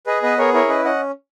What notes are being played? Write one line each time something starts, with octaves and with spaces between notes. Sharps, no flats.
G#4 B4 D#5
B3 B4 D#5
G#4 A#4 C#5
E4 A#4 C#5
C#4 B4 D#5
C#4 D#5 F#5